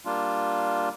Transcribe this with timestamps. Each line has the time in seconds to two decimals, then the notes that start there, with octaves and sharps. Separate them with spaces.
0.05 G3 A#3 D4 F4